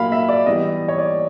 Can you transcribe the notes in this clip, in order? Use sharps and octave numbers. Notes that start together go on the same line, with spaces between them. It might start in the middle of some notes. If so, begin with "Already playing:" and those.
Already playing: A#2 F#3 A#3 F5 B5
E5
D5
E3 G3 B3 D#5
C#5
D5